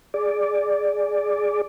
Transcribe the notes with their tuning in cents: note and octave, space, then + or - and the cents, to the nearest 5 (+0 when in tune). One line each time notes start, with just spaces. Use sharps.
G#4 +0 D5 +0